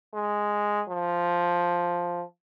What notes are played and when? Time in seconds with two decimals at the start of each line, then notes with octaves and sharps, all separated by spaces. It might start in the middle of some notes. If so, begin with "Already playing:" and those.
0.14 G#3
0.89 F3